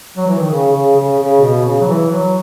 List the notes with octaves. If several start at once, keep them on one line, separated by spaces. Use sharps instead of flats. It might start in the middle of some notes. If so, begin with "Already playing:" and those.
F#3
E3
D#3
C#3
C#3
C#3
C#3
B2
C#3
F#3
E3
F#3